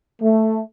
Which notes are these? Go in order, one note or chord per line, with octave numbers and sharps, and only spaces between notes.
A3